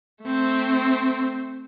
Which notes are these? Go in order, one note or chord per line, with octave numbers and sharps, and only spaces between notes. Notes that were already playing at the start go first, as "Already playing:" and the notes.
A3 C4